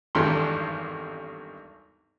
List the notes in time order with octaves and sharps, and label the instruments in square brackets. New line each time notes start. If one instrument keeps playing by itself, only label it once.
[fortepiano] G#1 E2 G2 G3 A4 C6